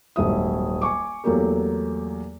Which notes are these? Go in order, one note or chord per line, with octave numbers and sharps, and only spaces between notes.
D#1 G#1 F#3 E5 D#6
G#5 C#6 D6
E2 F#3 A3 A#3 G4 A#4